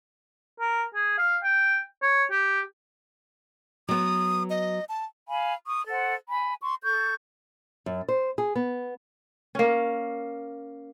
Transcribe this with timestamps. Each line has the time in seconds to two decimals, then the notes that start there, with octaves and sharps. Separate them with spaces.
0.60 A#4
0.94 G#4
1.18 F5
1.43 G5
2.02 C#5
2.31 G4
3.89 F#3 B3 D#6
4.50 D#5
4.89 A5
5.28 F5 G#5 B5
5.66 C#6 D#6
5.88 A4 C5 F#5
6.29 G#5 B5
6.62 C6 C#6
6.83 A4 C#6 G6
7.86 F#2
8.08 C5
8.38 G#4
8.56 B3
9.55 A#3 C#4